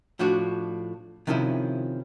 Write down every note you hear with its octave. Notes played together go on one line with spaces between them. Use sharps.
A2 F3 D4 F#4
C3 D#3 F3 C#4 E4 D#5